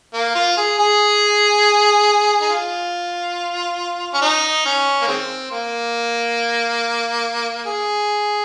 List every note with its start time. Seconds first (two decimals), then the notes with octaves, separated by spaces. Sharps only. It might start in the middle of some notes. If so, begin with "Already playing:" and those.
0.13 A#3
0.35 F4
0.57 G#4
0.78 G#4
2.41 D#4
2.49 F4
4.14 C#4
4.22 D#4
4.65 C#4
5.02 A#3
5.07 D#3 G#3 C4
5.51 A#3
7.66 G#4